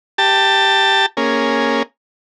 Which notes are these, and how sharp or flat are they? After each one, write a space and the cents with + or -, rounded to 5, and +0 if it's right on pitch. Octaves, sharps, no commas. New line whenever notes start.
G4 +0 A5 +20
A#3 +0 C#4 +0 G#4 +0